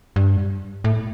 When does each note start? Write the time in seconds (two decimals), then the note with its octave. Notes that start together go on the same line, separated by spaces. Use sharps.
0.16 G2
0.84 A2